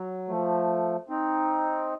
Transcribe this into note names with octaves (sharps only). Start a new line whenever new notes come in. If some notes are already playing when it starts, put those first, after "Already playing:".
Already playing: F#3
F3 A3
C4 D#4